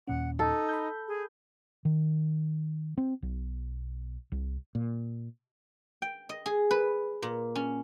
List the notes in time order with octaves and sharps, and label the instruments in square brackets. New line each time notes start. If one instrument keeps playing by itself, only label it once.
[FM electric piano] D#2 A#2 C#4 [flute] F#5
[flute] D#4 [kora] A4
[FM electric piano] B5 G6
[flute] G#4
[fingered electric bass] D#3
C4
B1
C2
[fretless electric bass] A#2
[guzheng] G5
D#5
G#4
B4
A#2
C#4